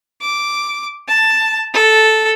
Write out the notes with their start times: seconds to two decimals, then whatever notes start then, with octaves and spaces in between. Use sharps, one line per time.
0.21 D6
1.08 A5
1.74 A4